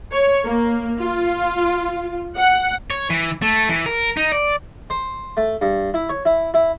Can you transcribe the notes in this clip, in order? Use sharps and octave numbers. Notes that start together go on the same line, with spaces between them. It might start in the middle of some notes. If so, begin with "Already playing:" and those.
C#5
A#3
F4
F#5
C#5
E3
A3
E3
A#4
D#4
D5
C5
A3
G2
E4
C#5
E4
E4